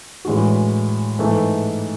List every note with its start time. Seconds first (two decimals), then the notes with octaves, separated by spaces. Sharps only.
0.25 A2 E3 G#3 D4 F#4
1.19 G#2 E3 A3